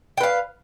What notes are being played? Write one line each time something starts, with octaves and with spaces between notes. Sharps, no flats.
B4 F5 G5